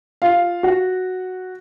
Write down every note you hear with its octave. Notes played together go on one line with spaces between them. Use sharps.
F4 F5
F#4 F#5